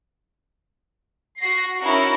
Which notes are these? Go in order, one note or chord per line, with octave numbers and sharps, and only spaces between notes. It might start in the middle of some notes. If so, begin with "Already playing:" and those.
F#4 A#6 C7
C#4 D#4 E4 F#4 A#4